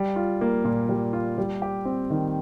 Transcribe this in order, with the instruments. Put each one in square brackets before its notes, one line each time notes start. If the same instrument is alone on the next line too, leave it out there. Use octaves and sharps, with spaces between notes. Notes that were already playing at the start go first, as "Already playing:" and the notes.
Already playing: [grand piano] G3
F4
A#3
A#2
G3
F4
G3
G4
C4
D#3